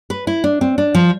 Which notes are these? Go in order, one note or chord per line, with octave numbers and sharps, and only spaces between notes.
B4
E4
D4
C4
D4
F3